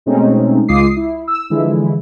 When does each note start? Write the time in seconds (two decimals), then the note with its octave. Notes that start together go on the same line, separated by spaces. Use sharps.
0.06 B2 G#3 A3 C4 C#4 D#4
0.68 C#2 G#3 F4 D6 D#6 C7
0.96 E4
1.28 E6
1.50 D3 E3 F3 G#3 E4